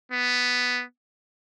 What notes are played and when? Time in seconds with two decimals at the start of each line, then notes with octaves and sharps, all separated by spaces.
0.11 B3